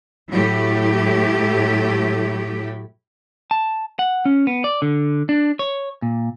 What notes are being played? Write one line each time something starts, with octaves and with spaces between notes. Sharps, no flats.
A2 F#3 A3 E4 G4
A5
F#5
C#4
B3
D5
D3
D4
C#5
A#2